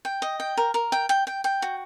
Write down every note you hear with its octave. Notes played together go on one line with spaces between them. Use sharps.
G5
D#5
G5
A#4
A#4
G5
G5
G5
G5
F#4